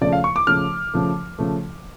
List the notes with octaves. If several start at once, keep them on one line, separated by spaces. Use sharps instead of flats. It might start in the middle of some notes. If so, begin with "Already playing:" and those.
C#3 F3 A3 D5
F5
C#6
D6
C#3 F3 A3 F6
C#3 F3 A3
C#3 F3 A3